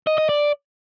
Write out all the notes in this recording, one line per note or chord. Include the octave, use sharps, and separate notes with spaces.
D#5
D#5
D5